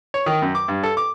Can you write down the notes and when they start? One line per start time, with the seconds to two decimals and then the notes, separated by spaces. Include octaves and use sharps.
0.14 C#5
0.26 D#3
0.42 F#2
0.55 D6
0.68 G2
0.83 A4
0.97 D6